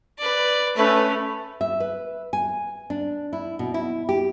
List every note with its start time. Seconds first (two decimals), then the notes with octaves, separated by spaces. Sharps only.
0.19 B4 D5
0.76 A3 C#4 B4
1.61 E5
1.80 B4
2.33 G#5
2.90 D4
3.33 E4
3.59 B2
3.74 E4
4.09 G4